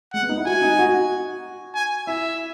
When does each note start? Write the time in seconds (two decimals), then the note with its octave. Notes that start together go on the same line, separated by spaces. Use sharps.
0.14 G#3 F#5
0.22 B3
0.29 D#4
0.38 E4
0.46 F#4 G#5
0.62 D#4
0.79 F#4
1.74 G#5
2.07 E4 E5